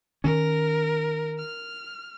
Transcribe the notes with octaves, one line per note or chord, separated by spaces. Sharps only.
D#3 C#4 A#4
F6